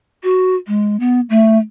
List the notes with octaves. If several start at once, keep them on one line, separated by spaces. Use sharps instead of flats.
F#4
G#3
B3
A3